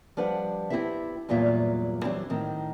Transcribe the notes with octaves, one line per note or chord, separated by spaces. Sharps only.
F3 G3 D4 B4 F#5
B3 C4 E4 G4 B4 E5
E2 G2 A#2 F#3 F4 E5
E3 F#3 G3 C4 D4
A2 D#3 C4